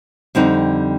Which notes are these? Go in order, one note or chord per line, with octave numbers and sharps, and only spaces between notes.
F2 D3 G3 C4 D#4